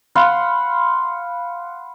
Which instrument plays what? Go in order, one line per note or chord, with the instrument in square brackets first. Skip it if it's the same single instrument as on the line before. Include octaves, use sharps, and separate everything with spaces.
[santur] F5 F#5 B5 C6